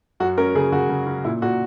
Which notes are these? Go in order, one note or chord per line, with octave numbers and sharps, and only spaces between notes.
F#2 F#4
C#4 A#4
C#3 G#4
C#3 F#4
C#3
C#4
A#2 E4
A#2 F#4